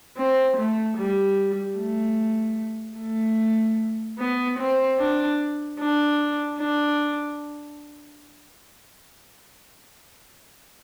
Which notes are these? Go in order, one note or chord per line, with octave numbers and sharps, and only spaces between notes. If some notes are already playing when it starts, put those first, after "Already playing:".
C4
A3
G3
A3
A3
B3
C4
D4
D4
D4